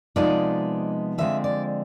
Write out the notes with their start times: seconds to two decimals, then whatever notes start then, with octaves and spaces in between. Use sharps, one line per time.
0.16 C3 F3 G#3 B3 D#4 D5
1.18 D3 F3 G#3 C4 E5
1.44 D5